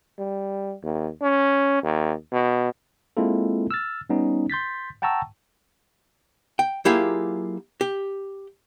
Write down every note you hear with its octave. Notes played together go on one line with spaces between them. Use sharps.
G3
D#2
C#4
D#2
B2
G#3 A#3 C4 E4 F4 A4
E6 F6 A6
G3 B3 C#4 D#4
C6 G6 A6 B6
F#5 G5 A5 A#5 C#6 E6
G5
F#3 A#3 E4 F4 G4 G#4
G4